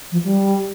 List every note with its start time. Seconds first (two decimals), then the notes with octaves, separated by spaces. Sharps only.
0.12 F3
0.24 G3